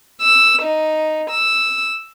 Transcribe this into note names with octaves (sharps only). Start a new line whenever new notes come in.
E6
D#4
E6